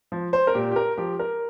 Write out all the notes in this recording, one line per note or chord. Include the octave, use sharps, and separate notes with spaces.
F3
C5
A#4
A#2 G4
G4
A#4
F3 G4
A#4